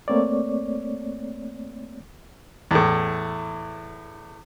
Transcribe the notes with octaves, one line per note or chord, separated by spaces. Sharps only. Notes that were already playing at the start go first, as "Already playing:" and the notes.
A3 A#3 C4 C#5 D5
E2 A2